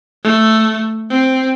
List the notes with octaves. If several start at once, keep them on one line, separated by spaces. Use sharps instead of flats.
A3
C4